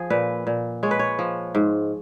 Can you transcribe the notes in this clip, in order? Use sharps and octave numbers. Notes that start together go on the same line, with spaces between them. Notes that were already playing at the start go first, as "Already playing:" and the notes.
Already playing: F3 G#4
A#2 B4
A#2
G#3 C#5
B4
C#5
F3
G#2